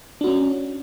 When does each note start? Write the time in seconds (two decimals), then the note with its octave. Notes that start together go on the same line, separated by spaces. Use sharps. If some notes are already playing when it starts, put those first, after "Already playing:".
0.21 D4
0.24 F#4
0.27 C#4